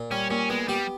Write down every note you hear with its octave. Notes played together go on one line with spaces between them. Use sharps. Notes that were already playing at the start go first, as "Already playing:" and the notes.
Already playing: A#2
G3 C#4
A#2 C#4
G#3 B3
G3 G4